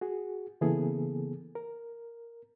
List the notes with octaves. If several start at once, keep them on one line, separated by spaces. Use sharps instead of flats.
F#4 G#4
C#3 E3 A#3 B3 G#4 A4
A#4